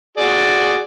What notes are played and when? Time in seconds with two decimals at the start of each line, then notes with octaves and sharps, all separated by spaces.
0.18 F#4 G#4 D5